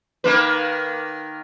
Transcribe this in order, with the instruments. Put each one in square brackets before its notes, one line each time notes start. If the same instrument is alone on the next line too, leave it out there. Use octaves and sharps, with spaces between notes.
[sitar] D#3 A#3 B4